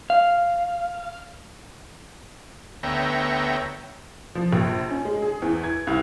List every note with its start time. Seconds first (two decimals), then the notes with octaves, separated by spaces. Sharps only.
0.10 F5
2.83 D2 B3 C#5 E5 G5 A#5
4.35 F3
4.53 A#1
4.90 C#4
5.05 G#3
5.22 G#4
5.42 E2
5.64 G#6
5.87 C2